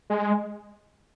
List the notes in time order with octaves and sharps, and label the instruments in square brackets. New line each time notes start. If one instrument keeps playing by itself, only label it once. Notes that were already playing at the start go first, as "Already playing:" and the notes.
[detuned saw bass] G#3